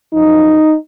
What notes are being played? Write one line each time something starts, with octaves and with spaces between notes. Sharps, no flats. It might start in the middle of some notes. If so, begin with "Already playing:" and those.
F#2 F3 D#4